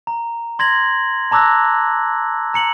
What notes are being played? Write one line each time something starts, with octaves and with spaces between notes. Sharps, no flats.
A#5
C6 G#6 A#6 F#7
A5 A#5 D6 E6 F#6 A#6
A#5 C#7 F#7